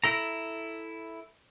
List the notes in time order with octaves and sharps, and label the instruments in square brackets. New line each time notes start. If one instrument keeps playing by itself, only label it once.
[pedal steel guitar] E4 A4 A#5